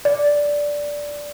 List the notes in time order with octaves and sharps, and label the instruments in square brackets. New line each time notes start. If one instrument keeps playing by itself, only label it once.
[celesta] D5